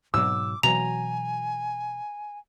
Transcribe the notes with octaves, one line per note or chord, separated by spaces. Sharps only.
G#2 B2 F#3 D6 E6
B2 E3 F#3 G#5 A#5 F7